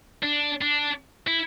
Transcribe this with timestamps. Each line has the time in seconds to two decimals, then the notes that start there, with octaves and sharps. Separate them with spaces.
0.23 D4
0.62 D4
1.27 E4